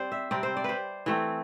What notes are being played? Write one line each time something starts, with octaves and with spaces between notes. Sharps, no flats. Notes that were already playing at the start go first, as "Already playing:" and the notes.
Already playing: G3 C4 C5 D5
E5
C3 G3 C4 D5
C5
D5
B4 C5
E3 A3 C4